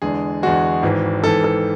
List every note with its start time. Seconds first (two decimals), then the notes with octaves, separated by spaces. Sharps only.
0.02 E2 D3 G#3 G#4
0.43 E2 D3 G#3 F#4
0.83 G#1 G#2 E3
1.23 G#1 G#2 E3 A4
1.44 A4